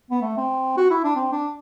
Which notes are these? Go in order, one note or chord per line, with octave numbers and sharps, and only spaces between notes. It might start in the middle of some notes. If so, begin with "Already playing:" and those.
B3
A3
C4
F#4
E4
D4
C4
D4